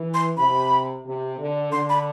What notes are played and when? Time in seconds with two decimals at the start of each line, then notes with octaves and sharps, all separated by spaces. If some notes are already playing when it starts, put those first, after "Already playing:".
Already playing: E3
0.14 C6
0.37 C3 B5
1.05 C3
1.38 D3
1.72 D3 C6
1.89 B5